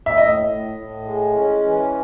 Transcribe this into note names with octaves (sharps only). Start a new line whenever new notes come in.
E5
A2 D#5
A2
A2
G#3
C#4
E3